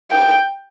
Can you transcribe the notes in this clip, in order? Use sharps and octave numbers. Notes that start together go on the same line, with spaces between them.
G5